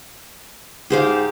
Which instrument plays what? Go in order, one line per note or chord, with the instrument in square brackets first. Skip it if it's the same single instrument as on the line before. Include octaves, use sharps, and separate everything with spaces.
[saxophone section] G#2 G4 [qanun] G#4 C5 F5